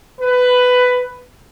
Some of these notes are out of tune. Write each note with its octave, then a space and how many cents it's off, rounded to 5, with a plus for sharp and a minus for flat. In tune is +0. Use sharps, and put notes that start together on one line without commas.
B4 +10